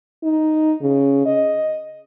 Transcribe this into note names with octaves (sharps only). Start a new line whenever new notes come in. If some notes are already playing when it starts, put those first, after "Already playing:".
D#4
C#3
D#5